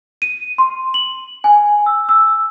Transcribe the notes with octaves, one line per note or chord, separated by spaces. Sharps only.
D#7
C6
F#7
G#5
E6
E6